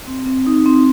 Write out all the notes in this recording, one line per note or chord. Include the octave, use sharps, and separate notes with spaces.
C4
C4
D#4
C4